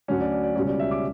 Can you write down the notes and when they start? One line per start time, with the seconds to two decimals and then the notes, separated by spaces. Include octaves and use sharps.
0.08 D2 D3 F#3 C#4 C#5
0.20 D5
0.32 D5
0.43 D5
0.55 C#2 B2 G3 C#4
0.67 D5
0.79 E5
0.91 D6